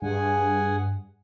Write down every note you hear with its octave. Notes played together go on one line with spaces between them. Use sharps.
G2 G#4 F#5 G#5